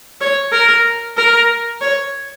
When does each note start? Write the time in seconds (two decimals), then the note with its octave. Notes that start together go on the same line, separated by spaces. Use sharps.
0.21 C#5
0.52 A#4
1.17 A#4
1.81 C#5